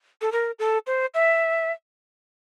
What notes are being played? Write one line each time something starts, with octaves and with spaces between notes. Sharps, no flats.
A4
A#4
A4
C5
E5